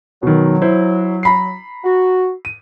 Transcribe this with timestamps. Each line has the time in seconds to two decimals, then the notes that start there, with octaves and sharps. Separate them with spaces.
0.23 B2 D#3 F#3
0.62 E4 C5
1.23 A#5 B5 C7
1.85 F#4
2.45 D#7